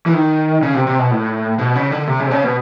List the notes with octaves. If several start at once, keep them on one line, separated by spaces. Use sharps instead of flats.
E3
D#3
C#3
C3
C3
B2
A2
B2
C#3
D3
C3
C#3
C3
C#3
B2